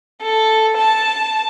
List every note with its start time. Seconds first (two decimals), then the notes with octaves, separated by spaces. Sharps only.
0.22 A4
0.78 A5